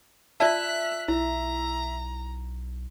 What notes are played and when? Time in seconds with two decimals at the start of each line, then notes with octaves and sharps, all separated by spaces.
0.40 F4 D5 E5 A5 F#6 B6
1.08 B1 E4 A#5